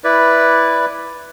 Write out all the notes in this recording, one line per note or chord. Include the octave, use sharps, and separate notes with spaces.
E4 B4 D5